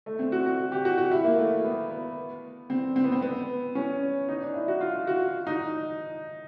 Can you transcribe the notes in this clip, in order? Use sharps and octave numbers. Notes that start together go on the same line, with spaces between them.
A3
C4
F#4
F#4
G4
F#4
F#4
E4
A#3
A3
B3
B3
C4
C4
B3
C4
B3
C#4
D#4
D4
E4
F#4
F4
F#4
D#4